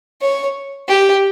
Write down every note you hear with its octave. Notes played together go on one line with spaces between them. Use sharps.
C#5
G4